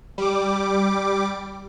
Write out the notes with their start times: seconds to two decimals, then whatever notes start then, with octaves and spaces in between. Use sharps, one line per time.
0.18 G3 D6